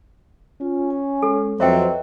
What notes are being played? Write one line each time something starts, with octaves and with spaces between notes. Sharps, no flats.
C#4 F4
G#5
G#3 A4
F2 F#3 C4 B4 C#5 D#5 E5 G5